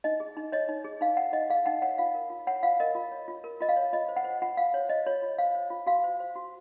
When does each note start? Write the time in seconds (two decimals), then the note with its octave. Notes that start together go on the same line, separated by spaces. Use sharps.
0.04 D#4 D#5
0.20 G#4
0.37 D#4
0.52 C#5 D#5
0.69 D#4
0.84 G#4
1.01 D#4 F5
1.17 C#5 F#5
1.33 D#4 D#5
1.50 G#4 F5
1.66 D#4 F#5
1.82 C#5 F#5
1.98 F4 F5
2.15 A#4
2.30 F4
2.47 C#5 F#5
2.63 F4 F5
2.80 A#4 D#5
2.95 F4
3.12 C#5
3.28 F4
3.44 A#4
3.61 F4 D#5
3.69 F5
3.76 C#5
3.93 F4 D#5
4.09 C5
4.16 F#5
4.25 C5
4.42 F4 F#5
4.57 F4 F5
4.74 C5 C#5
4.89 C5 D#5
5.06 F4 C#5
5.22 F4
5.38 C5 F5
5.55 C5
5.70 F4
5.86 F#4 F5
6.04 C5
6.20 C5
6.35 F#4